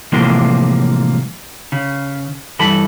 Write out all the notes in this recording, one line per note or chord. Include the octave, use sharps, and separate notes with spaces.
A2 C3 E3 F3 G#3 A#3
C#3
G2 E3 A4 B5